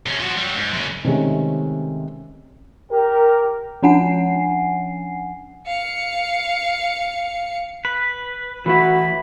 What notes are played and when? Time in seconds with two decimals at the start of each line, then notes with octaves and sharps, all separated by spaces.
0.06 C3 C#4
0.20 F3 F#4
0.37 F#3 G3
0.56 G#2
0.74 F#2 C#3
1.04 C3 D#3 G#3 A3 C#4
2.92 G4 A#4
3.83 F3 C#4 D4 F#5 G#5 C7
5.67 F5 C#7
7.85 B4
8.66 E3 A3 E4 F#4 B5